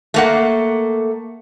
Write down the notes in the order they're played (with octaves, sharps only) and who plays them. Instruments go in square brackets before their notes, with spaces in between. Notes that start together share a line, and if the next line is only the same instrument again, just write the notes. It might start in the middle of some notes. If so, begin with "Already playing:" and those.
[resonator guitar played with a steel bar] A3 A#3 F#5